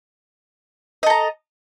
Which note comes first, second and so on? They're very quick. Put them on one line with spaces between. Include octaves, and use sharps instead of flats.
D#5 A4 A#5